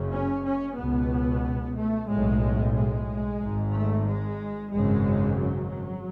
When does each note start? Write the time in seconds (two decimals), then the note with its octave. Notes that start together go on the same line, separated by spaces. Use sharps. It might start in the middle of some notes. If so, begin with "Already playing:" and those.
Already playing: F#1 F#2 C#3
0.11 C#4
0.45 C#4
0.77 C#2 B2 B3
1.77 A3
2.09 B1 A2 G#3
2.75 G#3
3.41 G#1 G#2
3.73 A3
4.07 G#3
4.72 G#1 F#2 C#3 G#3
5.39 F#3